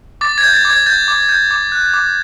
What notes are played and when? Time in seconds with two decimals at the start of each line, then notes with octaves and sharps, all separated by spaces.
0.21 D6 A6
0.38 G#6
0.43 G6
0.54 A6
0.65 D6
0.70 G#6
0.86 G6 A6
1.08 D6
1.29 G6
1.51 D6
1.72 F#6
1.94 D6